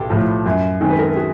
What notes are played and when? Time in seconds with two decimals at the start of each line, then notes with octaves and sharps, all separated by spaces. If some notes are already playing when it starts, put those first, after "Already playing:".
Already playing: B1 G4 A4
0.10 A2 F3
0.46 F#2
0.81 D#3 G#3 C4
0.90 B4
0.99 A#4
1.07 A4
1.16 F#4 G#4